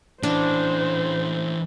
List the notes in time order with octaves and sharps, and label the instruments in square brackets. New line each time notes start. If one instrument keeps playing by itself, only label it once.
[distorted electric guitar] E3 C#4 [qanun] D4 [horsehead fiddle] C5